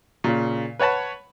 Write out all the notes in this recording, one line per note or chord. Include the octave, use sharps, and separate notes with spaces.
A#2 C#3
B4 C#5 F#5 A5 B5